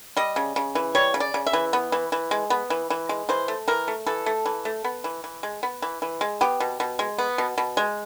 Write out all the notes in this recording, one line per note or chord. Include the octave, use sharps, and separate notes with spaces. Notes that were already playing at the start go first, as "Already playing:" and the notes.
G3 D#5
C#3
C#3
E3
G3 C#5
C#3
D5
C#3
E5
E3
B3
E3
E3
G#3
B3
E3
E3
G#3
E3 C5
A3
E3 A#4
A3
E3 A4
A3
E3
A3
B3
E3
E3
G#3
B3
E3
E3
G#3
B3 G4
B2
B2
G#3
B3
B2
B2
G#3